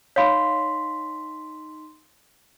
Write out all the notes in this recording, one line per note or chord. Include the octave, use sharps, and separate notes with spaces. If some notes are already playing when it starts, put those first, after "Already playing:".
D#4 C#5 F5 B5 C6 B6